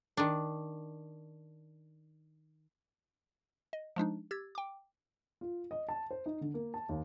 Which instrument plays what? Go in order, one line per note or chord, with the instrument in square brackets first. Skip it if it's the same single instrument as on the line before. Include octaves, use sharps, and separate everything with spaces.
[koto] D#3 D4
[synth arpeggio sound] D#5
F3 G#3 D4 D#4
G4 E6 G#6 A6
G5 D6
[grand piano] F4
D#5
A5
C5
D#4
D3
A#3
A5
D#2